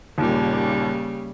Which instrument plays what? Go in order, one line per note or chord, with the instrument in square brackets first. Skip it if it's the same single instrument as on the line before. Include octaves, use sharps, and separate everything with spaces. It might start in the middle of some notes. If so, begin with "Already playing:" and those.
[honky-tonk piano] D#2 A#2 [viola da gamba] C#3 G3 A#3